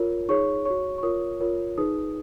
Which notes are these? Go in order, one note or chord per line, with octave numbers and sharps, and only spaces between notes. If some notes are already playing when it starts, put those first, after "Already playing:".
Already playing: F4 A#4 C#5
D#4 G#4 C#5 C#6
F#4 C#5 C#6
C#6
F4 A#4 C#5 D#6
F4 A#4 C#5
D#4 G#4 B4 D#6